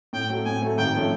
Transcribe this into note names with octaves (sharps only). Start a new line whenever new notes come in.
A2 G5
F#3 A3 C4
A2 G#5
F#3 A3 C4
G#1 G5
F3 A3 C#4